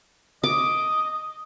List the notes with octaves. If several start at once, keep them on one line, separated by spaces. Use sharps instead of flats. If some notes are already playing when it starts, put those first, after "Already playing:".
D#5 D6